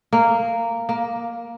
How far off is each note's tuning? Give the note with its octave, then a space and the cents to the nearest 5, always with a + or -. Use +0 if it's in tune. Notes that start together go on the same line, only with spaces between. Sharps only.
A#3 -10
A#3 +10